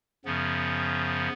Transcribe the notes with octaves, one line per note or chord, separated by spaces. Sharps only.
F#2 C#3 F3 B3